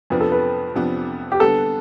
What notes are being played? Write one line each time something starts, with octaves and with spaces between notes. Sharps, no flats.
F2 C3 F3 B3 D4 B4
A4
B4
F2 C3 F3 B3 D4
G4
D3 G3 B3 A4